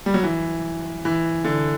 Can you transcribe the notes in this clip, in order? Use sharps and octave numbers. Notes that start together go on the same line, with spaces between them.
G3
F#3
E3
E3
D3